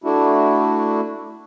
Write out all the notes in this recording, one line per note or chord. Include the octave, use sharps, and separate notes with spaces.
A3 D4 E4 F#4